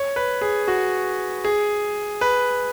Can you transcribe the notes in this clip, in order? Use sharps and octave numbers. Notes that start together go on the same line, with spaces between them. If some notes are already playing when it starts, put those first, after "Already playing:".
Already playing: C#5
B4
G#4
F#4
G#4
B4